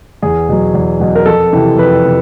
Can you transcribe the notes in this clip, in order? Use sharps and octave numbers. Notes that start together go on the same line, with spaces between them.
E2 G#4
B2 F#3
E2
B2 F#3
A#4
F2 A4
C3 E3
F2 B4
C3